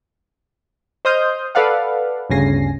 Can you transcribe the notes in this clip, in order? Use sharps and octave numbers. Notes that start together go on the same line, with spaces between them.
C5 D#5 C6 D#6 F6 G6
A4 B4 D5 F5 F#5
G1 D2 C#3 G#5 A#6 C7